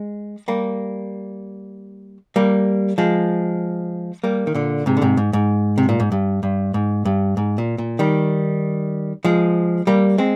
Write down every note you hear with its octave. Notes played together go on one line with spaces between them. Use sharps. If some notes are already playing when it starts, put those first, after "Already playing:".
Already playing: G#3
G3 A#3
G3 A#3
F3 G#3
G3 A#3
D#3
A#2 D3
G#2 C3
D3
G#2 C3
G#2
G#2
C3
A#2
G#2
G2
G2
G#2
G2
G#2
A#2
A#2
D#3 G3
F3 G#3
G3 A#3
G#3 C4